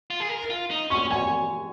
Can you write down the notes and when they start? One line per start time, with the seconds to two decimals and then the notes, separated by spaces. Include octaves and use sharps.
0.10 F4
0.20 G#4
0.29 A#4
0.50 F4
0.71 D#4
0.90 C#4 C#6
1.11 C#5 G#5